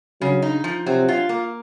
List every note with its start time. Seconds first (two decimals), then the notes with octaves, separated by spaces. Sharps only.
0.21 C#3 F#3
0.42 D#4
0.64 F3
0.86 C3 F#3
1.08 F4
1.29 A#3